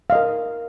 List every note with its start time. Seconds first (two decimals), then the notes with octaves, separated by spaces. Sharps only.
0.10 F5
0.12 D#5
0.15 A#4